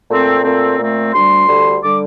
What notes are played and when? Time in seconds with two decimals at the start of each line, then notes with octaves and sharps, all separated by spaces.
0.10 A#2 A3 C4
0.44 A#2 A3 C4
0.79 A#2 A3 C4
1.13 D2 D3 G3 C6
1.48 D2 D3 G3
1.82 D3 G3 D6